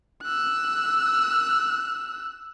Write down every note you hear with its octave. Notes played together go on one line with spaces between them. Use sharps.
E6 F#6